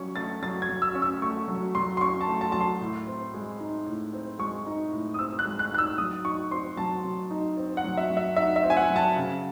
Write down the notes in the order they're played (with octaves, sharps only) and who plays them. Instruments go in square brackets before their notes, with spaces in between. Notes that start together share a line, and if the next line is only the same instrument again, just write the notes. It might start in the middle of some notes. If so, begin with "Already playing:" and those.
Already playing: [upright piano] F#3 C#4 C#6
A3 A6
F#3 A6
G#6
F#3
E6
C#4
E6
A3 C#6
F#3
F#3 C6
C6
C#4 C#6
A5
A3
A5
F#3 A5
C6
A2
C4
G#3
D#4
A2
C4
G#3 C#6
D#4
A2
D#6
C4 E6
F#6
G#3
F#6
D#4 F#6
E6
F#3 D#6
D#4 C#6
C4 C6
F#3 A5
F#3
D#4
C4
F#5
F#3
E5
F#3
E5
D#4 E5
E5
C4
G#5
F#5
F#3
A5
C#3